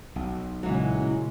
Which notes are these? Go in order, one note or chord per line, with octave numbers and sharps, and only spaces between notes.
B1
A#2 C#3 E3 F#3 G#3 C#4